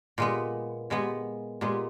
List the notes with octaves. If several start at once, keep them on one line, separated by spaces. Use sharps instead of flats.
A#2 G#3 B3
A#2 G#3 B3
A#2 G#3 B3